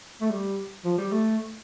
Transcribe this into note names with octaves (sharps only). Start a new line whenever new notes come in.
A3
G3
F3
G3
A3